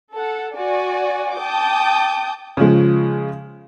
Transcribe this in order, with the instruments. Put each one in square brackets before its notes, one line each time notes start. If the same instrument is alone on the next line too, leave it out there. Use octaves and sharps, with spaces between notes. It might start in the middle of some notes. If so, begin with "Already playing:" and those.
[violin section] A4 F#5
F#4 D5 G#5
G5 A5 D6 D#6 G6
[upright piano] C#3 F3 G#3